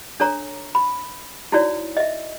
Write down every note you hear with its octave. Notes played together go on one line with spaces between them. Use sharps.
D4 A4 C#5 A#5
B5
D#4 E4 F#4 C#5 D5
D#5 E5